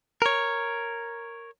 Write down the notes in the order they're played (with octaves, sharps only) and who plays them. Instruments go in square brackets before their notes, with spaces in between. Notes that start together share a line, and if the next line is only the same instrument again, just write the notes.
[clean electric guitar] A#4 C#5